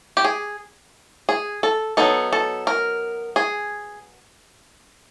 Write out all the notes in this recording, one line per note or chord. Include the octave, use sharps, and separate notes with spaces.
G4
G#4
G#4
A4
F#3 B3 D#4 A4
A4
A#4
G#4